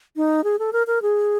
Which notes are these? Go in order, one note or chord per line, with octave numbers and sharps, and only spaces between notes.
D#4
G#4
A4
A#4
A#4
G#4